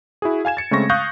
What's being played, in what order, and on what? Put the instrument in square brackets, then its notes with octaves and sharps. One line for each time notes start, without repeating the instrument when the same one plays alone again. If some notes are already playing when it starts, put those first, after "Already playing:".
[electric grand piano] E4 F#4 G#4
F5 G#5 G#6 E7
A6 C#7
C#3 G#3 A3 C4 C#6 A#6
F5 C#6 D#6 F#6 G6 A#6